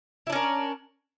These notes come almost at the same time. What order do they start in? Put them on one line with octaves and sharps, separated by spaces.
E4 D4 C#4 A#4